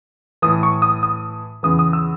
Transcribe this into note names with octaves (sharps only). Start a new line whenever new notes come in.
A2 E3 D#6
C#6
D#6
D#6
E2 C#3 E3 D#6
D#6
E6